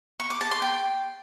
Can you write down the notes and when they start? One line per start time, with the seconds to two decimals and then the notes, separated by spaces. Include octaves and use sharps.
0.20 C#6
0.30 D6
0.41 A5
0.51 C6
0.62 G5